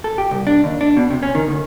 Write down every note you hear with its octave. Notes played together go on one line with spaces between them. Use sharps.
A4
G4
C2
D4
D#2
D4
B2
C3
C#4
D#3
D2